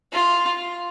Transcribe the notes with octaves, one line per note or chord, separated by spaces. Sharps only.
F4